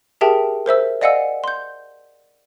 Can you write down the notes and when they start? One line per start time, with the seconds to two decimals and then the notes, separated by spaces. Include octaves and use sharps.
0.21 G4 G#4 A#4 E5 G5 A5
0.66 A#4 C5 E5 E6
1.01 D5 D#5 F5 F#5 G#5 E6
1.44 C6 G6